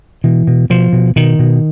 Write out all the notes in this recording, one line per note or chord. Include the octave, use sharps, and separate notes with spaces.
B2 E3
B2
B2 F3
B2
B2 D#3
B2